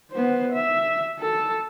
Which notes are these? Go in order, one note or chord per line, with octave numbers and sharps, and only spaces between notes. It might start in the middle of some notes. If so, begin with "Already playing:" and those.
B3 C5
E5
A4